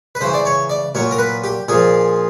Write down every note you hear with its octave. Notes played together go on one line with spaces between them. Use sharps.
B4
C#3 E3 C5
D5
C#5
D5
A#2 F#3 C#5
A#4
B4
G4
A#2 F3 G#4